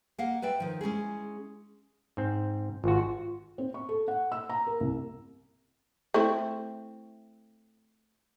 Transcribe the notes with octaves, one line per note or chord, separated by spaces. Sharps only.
A#3 D#5 F5 F#5
B4 D5 E5 G5
D#3 F3
G#3 C#4 E4 G#4
G#2 C4
G#1 F4 F#4
C4
C#6
A4
F#5
E6
A#5
A#4
C2
A3 C4 E4